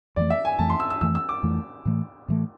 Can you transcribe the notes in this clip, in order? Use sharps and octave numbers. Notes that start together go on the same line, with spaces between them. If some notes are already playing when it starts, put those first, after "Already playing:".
F2 E3 A3 D5
E5
G#5
F2 E3 A3 A5
C6
E6
E6
F2 E3 A3 E6
E6
D6
F2 E3 A3
A2 E3 A3
A2 E3 A3